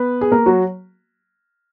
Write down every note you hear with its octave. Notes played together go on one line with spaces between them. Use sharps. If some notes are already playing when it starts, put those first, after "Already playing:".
Already playing: B3 B4
G#4
A#3 A#4
F#3 F#4